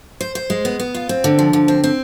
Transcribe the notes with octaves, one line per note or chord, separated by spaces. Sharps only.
C5
C5
G#3
B3
B3
F4
C4
D3
F3
D3
C4
C4